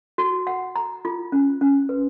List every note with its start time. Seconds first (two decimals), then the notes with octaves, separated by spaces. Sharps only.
0.18 F#4
0.47 F#5
0.76 A#5
1.05 F4
1.32 C#4
1.61 C#4
1.89 B4